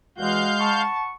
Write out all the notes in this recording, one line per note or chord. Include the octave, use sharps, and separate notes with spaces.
E2 G2 E3 G#3 F#4 F5 G6
F#5 A5 B5 C#6